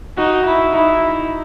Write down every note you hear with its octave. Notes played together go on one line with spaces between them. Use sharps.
D#4 F#4
E4
D#4 E4